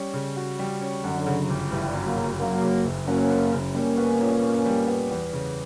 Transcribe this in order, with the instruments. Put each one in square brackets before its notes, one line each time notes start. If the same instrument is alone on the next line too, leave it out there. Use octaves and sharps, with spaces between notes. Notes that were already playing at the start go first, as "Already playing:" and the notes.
Already playing: [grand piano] G3 C#4
C#3
F#4
G3
C#4
[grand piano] F#2 [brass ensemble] D3 F#3
[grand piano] C#3
G1
[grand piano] G1 [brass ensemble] E3 G3
[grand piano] F#2
[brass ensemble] F#3 A#3
[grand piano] C#3
[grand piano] F#2 [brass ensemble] F#3 A#3
[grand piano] C#3
F#1
[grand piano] F#3 [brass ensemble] A#3 C#4
[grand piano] F#2
C#3
[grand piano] G3 [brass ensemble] A#3 C#4
[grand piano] B3
A#2
A#2
G3
B3
E2
C#3